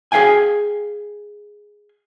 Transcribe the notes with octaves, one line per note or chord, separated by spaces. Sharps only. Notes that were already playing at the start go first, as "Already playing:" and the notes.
G#4 A#4 F5 G5 G#5